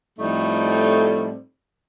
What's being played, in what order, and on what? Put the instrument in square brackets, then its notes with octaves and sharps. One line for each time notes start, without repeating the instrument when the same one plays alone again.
[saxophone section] A2 F3 G3 A3 C4 D#4